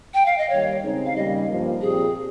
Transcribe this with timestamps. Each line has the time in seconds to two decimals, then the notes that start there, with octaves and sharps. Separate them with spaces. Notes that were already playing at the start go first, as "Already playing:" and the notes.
0.14 G5
0.26 F5
0.38 D#5
0.50 D#2 D#3 G3 C#5
0.83 C#3 G#3 C4 D#4
1.06 F5
1.16 D#2 C#3 G3 D#5
1.48 G2 F3 A#3
1.81 A#2 F3 C4 G4 G#4